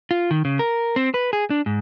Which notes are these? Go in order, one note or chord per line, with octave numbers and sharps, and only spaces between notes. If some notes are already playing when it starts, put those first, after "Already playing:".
F4
D#3
C#3
A#4
C4
B4
G#4
D4
G#2